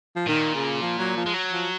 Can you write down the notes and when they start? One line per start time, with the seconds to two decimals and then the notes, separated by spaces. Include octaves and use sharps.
0.16 F3
0.27 A#2 D#3
0.55 C#3
0.82 F3
0.98 F#3
1.17 F3
1.26 G#3
1.34 F#3
1.52 F3